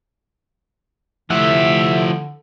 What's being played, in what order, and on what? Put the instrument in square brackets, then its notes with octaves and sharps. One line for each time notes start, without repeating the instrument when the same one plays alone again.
[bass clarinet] D3 [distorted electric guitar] F3 G4 [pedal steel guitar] A3 E4 F#5 [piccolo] E5